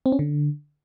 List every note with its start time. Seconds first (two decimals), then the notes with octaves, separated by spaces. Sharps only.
0.06 C4
0.12 C#4
0.19 D3